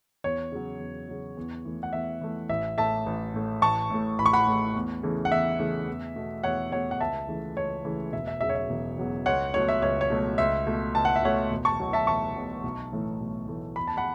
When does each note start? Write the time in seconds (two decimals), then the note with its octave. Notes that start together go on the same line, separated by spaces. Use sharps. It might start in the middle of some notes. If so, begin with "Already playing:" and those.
0.24 E2 C#5
0.52 C#3 F#3
0.80 E2
1.08 C#3 F#3
1.37 E2
1.65 E3 A3
1.83 F#5
1.93 E2 E5
2.21 E3 A3
2.49 A1 E5
2.78 A2 A3 E5 A5
3.06 A1
3.34 A2 A3
3.62 A1 A5 C#6
3.90 A2 A3
4.18 A1 B5
4.26 C#6
4.33 F#5 B5
4.47 A2 A3
4.75 E2
5.03 C#3 E3 A3
5.25 F#5
5.31 E2 E5
5.59 C#3 E3 A3
5.87 E2
6.16 B2 A3
6.43 E2 C#5 F#5
6.72 B2 A3 C#5 F#5
6.91 F#5
7.00 C#2 E5 A5
7.28 C#3 E3 A3
7.56 C#2 C#5
7.85 C#3 E3 A3
8.13 E1 E5
8.27 E5
8.41 E2 C#3 F#3 E5
8.49 C#5
8.55 E5
8.70 E1
8.98 E2 C#3 F#3
9.26 C#2 C#5 F#5
9.54 B2 F#3 A3 C#5
9.68 E5
9.82 C#2 C#5
10.01 C#5
10.10 B2 F#3 A3
10.38 C#2 E5
10.67 B2 A3
10.95 C#2 A5
11.05 F#5
11.16 E5
11.23 B2 A3 C#5 F#5
11.51 E1
11.65 A5 C#6
11.79 E2 B2 F#3
11.93 E5 A5
12.07 E1 A5 C#6
12.36 E2 B2 F#3
12.63 B1
12.92 A2 E3 A3
13.20 B1
13.48 A2 E3 A3
13.76 E2 B5
13.87 A5
13.97 F#5 B5